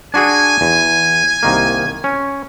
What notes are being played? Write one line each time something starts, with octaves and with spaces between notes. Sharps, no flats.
D4 F#4 G#4 G#5
E2
C2 D#3 A#3
C#4